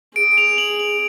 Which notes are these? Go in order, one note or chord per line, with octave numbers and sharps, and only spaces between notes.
G#4 D7
D7
F7
F#7
F#7